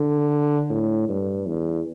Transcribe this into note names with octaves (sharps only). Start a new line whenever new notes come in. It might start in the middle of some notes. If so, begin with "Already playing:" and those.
Already playing: D3
A2
G2
E2